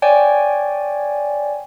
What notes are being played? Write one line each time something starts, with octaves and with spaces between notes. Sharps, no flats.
C#5 D5 G5 G#5